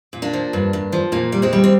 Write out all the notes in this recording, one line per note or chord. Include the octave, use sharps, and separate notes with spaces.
A#2
A#3 D4
F3
G2
G2
F3
A#2 A#3
G3
G#3 C4
G3
C4